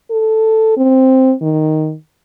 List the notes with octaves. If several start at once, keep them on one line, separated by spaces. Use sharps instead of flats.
A4
C4
D#3